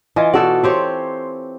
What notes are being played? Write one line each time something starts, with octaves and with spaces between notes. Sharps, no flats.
E3 F4 D#5 G#5
B2 F#4 A4 D5
C4 G4 C#5 C6